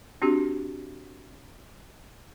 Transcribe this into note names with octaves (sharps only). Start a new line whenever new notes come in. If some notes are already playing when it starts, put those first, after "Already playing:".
C4 D4 F#4 G4